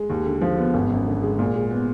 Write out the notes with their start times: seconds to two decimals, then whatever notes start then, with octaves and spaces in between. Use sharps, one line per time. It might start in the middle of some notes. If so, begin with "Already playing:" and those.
Already playing: G#3
0.10 D#2
0.26 D3
0.41 F3
0.58 B3
0.74 G#1
0.90 F#2
1.06 D3
1.23 G#3
1.39 A#2
1.55 G#3
1.71 B3